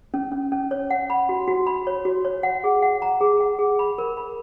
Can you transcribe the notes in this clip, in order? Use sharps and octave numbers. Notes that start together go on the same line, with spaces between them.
C#4
C#4
C#4
C#5
F#5
B5
F#4
F#4
B5
C#5
F#4
C#5
F#5
G#4
F#5
A#5
G#4
F#5
G#4
B5
A#4
B5